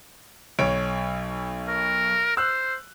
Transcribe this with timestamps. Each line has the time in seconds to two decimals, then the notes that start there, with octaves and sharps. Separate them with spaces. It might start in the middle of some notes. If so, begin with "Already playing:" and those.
0.59 B1 C#5 D7
1.69 A#4
2.37 C5 E6 F#6